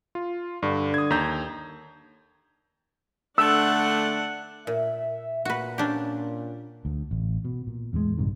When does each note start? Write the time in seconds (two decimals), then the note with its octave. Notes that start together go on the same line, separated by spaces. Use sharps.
0.15 F4
0.63 G2 D3
0.94 D#6 G#6
1.10 D#2 A#5 G6
3.38 D3 A3 D4 F#5 E6
4.67 A#2 E5
5.45 A#2 F#4 B4
5.78 C#4 D4 G4
6.85 D2
7.11 A1
7.45 B2
7.67 A#2
7.93 E2 A2 C3 G#3
8.17 A#1 G2 C3 D#3